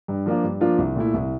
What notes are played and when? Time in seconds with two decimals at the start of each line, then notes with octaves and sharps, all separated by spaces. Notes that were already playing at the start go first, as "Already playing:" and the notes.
0.08 G2
0.26 F3 A#3 D4 F4
0.44 G2
0.61 F3 A#3 D4 F4
0.78 C2
0.96 A#2 A3 E4
1.14 C2